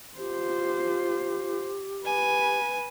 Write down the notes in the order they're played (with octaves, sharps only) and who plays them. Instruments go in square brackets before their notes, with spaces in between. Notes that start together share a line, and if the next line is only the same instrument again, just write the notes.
[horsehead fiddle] F4 C5 [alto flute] G4
[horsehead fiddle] B4 [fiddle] G#5